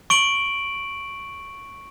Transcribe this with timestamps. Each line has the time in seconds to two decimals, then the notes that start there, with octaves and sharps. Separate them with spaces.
0.10 C#6 D7 F#7